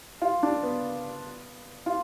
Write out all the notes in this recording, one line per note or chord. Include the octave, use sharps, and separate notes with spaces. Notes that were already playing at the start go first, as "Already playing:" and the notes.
F4
D4
B3
F4